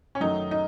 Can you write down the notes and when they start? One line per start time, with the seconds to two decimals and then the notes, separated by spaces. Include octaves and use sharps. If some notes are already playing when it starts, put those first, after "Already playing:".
0.15 C#4
0.20 F#2 D#3 F#3 A3 D#4
0.51 D#4